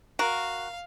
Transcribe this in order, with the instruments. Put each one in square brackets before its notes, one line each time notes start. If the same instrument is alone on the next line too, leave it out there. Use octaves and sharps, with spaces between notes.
[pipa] F#4 [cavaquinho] A#4 [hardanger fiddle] F5